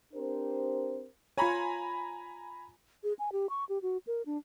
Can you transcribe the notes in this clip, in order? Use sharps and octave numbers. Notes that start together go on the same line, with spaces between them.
C4 D4 G4 A#4 C5
F4 C#5 G#5 A#5 B5
G#4
G#5
G4
C#6
G4
F#4
A#4
D4